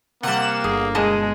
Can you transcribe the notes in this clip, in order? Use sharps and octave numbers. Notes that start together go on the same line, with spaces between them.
C3 G3 A#3 F#5 E7
G1 G#4
B2 G#3 G#4 A5